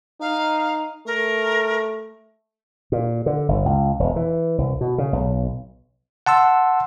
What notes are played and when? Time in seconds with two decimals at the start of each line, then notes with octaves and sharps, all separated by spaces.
0.21 D#4 F5
1.07 A3 A#4
2.92 A#2
3.26 D3
3.48 G1
3.66 C#2
3.99 E1
4.16 E3
4.58 C2
4.81 B2
4.98 C#3
5.13 B1
6.26 F#5 A5 C6 E6